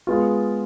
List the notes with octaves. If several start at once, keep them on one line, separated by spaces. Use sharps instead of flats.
G#3 B3 F4